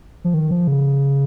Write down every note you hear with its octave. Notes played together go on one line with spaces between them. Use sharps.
F3
D#3
F3
C#3